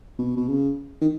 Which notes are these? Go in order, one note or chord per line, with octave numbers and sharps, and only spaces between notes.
B2
B2
C#3
D#3